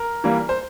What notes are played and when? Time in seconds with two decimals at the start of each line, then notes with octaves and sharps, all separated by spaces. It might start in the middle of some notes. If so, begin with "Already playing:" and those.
Already playing: A#4
0.24 E3 G3 A#3
0.49 C5